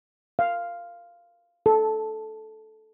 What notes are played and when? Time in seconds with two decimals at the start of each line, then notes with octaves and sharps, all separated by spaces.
0.39 F5
1.66 A4